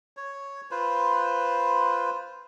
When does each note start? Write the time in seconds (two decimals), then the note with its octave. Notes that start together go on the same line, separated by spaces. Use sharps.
0.17 C#5
0.71 F4 B4 C5